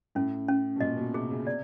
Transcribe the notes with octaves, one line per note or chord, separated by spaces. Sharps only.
A2 C#4
C#4
B2
A#2 D#5
B2
C3 G#4
C#3
C3 D5